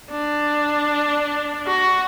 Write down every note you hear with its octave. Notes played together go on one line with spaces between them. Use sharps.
D4
F#4